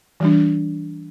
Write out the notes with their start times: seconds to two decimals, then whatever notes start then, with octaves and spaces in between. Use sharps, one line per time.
0.20 E3 G3 D4